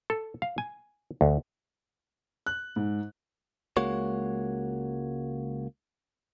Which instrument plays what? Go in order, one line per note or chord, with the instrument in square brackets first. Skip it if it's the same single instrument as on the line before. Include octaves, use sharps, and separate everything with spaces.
[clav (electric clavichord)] A4
F5
G#5
D2
[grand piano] F#6
G#2
[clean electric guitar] C#2 G#3 A#3 F#4 C#5